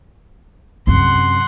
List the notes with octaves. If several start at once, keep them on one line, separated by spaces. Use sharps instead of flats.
F#2 C3 F#5 C6